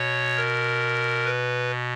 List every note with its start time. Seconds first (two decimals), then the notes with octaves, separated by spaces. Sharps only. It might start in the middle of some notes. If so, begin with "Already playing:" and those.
Already playing: B2 C#5
0.37 A#4
1.25 B4